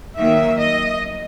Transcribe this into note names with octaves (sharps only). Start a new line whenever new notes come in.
D#3 F#3 A#3 E5
D#5